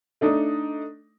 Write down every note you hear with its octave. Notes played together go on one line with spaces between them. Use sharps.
A3 D4 D#4